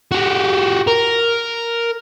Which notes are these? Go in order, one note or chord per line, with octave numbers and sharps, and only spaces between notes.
F#4 G4
A#4